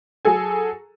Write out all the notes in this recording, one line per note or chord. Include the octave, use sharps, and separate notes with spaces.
F#3 G#4 A4 G#5